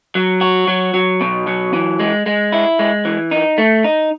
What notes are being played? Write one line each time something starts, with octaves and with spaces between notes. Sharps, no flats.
F#3
F#4
F#3
F#3
B2
F#3
E3
G#3
G#3
E4
G#3
E3
D#4
A3
D#4